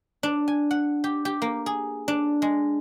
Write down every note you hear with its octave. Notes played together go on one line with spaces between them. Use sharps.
D4
G#5
F#5
G4
G4
A#3
G#4
D4
G#3